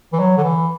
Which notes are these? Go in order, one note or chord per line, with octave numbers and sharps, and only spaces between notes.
E3
F#3
D3
E3